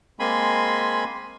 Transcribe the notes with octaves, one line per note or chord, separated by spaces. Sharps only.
G#3 A#3 C4 G#5 B5 C6